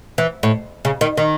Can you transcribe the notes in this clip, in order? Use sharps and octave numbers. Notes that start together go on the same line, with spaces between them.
E3
A2
C#3
D#3
D#3